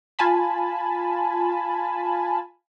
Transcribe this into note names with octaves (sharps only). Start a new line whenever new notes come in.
F4 G#5 A5 B5